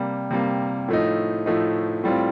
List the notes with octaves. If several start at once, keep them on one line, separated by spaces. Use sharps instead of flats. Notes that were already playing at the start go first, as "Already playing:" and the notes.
Already playing: C3 G3 A#3
C3 G3 A#3
A2 F3 A3 D#4
A2 F3 A3 D#4
A2 G3 C4 F4